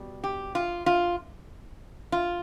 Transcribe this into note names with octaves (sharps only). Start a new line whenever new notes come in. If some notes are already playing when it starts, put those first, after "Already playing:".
Already playing: B2 G3
G4
F4
F4
F4